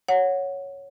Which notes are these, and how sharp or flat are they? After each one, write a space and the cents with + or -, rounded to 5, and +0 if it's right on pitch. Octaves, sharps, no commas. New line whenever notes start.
C#5 +0 F#5 -10